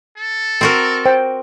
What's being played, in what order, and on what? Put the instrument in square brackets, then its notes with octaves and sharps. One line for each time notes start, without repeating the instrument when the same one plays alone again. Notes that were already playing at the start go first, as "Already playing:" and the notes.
[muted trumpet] A4
[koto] C4 F#4 A#4
[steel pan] C5 G5